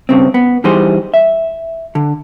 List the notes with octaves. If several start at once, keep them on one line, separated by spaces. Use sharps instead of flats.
G2 C#3 C4
B3
E3 G3 D#4 G#4 C5
E5
D3